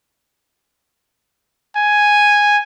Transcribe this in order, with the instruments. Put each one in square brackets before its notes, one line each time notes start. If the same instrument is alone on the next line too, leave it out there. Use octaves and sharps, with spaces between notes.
[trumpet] G#5